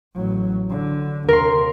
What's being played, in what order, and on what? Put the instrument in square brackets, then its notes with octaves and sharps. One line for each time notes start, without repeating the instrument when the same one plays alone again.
[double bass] A1 F#3
D3
[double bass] D#2 C3 [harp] A#4 C6